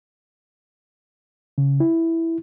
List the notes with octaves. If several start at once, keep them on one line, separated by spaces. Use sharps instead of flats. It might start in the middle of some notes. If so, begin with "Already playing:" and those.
C#3
E4